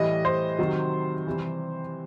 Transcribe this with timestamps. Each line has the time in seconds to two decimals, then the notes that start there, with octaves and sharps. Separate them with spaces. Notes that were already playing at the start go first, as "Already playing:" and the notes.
Already playing: A2 E3 G3 D#5
0.25 C5
0.59 C3 D#3 F#3
1.27 C3 E3 G3